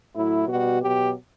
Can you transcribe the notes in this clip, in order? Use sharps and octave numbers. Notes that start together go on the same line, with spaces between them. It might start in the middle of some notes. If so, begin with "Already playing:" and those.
A2 F#3 E4
B2 G3 F#4
B2 F#3 G4